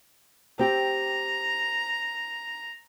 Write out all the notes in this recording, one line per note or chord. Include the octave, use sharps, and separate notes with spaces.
C4 G4 A#5